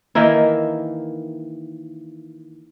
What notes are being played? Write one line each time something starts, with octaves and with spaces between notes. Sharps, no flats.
D#3 E3 A#3 E4